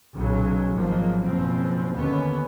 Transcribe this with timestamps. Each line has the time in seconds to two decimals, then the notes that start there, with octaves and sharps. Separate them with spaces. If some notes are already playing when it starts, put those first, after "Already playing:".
0.15 B1 A#2 C#3 F#3
0.76 G#1 F3 F#3 A#3
1.22 F#1 B2 F3 C4
1.97 D#2 D3 B3 C#4